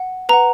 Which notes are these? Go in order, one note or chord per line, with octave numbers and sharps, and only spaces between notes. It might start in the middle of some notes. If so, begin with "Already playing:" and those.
Already playing: F#5
B4 F#5 A#5